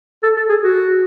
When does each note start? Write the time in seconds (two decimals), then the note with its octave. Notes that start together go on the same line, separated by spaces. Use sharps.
0.23 A4
0.37 A4
0.49 G#4
0.64 F#4